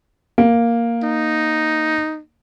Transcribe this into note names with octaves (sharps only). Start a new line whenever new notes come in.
A#3
D#4